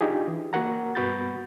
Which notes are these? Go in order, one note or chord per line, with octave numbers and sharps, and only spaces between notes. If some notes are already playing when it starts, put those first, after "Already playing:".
D4 D#4 F4 G4 G#4
E3
A#3 F#4 A#4 F#5 A#5
G2 B3 F#4 B5 G6 A6